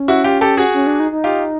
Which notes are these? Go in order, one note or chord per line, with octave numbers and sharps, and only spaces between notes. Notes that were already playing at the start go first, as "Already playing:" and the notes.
Already playing: C#4
E4 F#4
F4 G4
G4 A4
F#4 G#4
C#4
D4
D#4
D#4
F4 G4